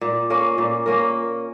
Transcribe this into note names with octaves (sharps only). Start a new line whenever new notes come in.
A#2
A#3 C#4 A#4
A#2
A#3 C#4 A#4